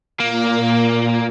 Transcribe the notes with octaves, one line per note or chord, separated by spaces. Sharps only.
A#2 A#3